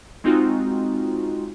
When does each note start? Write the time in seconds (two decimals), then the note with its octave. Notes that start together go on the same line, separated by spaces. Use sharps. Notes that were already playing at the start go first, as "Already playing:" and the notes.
0.24 G#3 C4 D#4 F4 F#4